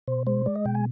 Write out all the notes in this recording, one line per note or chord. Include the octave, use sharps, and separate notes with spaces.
B2 C5
G#3 C5
G#3 D5
D#5
B2 G5
G#5